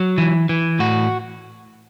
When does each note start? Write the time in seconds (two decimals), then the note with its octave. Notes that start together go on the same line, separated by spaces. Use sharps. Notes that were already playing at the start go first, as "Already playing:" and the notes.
Already playing: F#3
0.18 E3
0.49 E3
0.79 A2 F#4